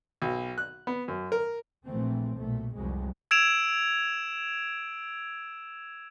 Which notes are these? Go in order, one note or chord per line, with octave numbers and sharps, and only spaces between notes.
B1
F#6
B3
F#2
A#4
A#1 E3 A3 C4
B1 A#2 A3
C2 F2 F#3 G#3
E6 G#6 D7 E7 F7